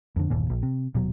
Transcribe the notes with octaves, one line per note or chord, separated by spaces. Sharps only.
F2 D3
G1 D#2 A#2
A#1
C3
D#1 B2 F#3